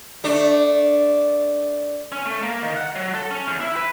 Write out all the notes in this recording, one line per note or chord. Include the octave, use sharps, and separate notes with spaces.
A3 D4
C#4
A3
A#3
D#3
F#5
F#3
A4
C#4
E2
E4
B4